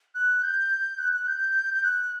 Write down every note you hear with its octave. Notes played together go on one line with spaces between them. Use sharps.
F#6
G6
F#6
F#6
G6
G6
F#6